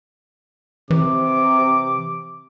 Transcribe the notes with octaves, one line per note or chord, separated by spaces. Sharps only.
C3 E3 D6